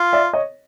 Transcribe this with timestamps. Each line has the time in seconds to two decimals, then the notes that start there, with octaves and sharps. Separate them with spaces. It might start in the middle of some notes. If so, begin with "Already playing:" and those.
Already playing: F4
0.13 D5 E5
0.33 C#5 D#5